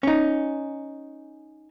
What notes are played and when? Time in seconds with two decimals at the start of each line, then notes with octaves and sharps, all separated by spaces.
0.03 C#4 D#4